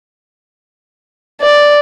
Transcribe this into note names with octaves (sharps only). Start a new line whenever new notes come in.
D5